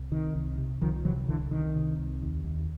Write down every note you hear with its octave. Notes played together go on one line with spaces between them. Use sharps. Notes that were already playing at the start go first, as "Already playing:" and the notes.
Already playing: C2
C3 D#3
C2
C3
C2 D#3 F3
C3 E3 F#3
C2 D3 E3
C2 D#3
C3
C2
D#2
D#2